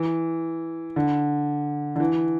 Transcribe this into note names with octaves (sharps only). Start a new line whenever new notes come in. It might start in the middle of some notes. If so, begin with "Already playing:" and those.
Already playing: E3
D3
D3
E3